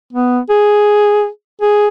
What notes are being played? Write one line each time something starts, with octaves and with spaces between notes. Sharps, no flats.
B3
G#4
G#4